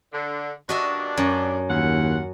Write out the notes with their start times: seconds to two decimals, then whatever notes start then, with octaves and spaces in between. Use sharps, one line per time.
0.13 D3
0.69 G2 A#2 D4 F#4 D#5 E5
1.17 F#2
1.69 D#2 E3 F4 F#5